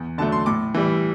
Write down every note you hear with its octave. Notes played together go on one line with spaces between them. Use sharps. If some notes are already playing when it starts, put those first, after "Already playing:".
Already playing: E2
D3 F#3 A3 A5
C6
A2 D6
E3 G3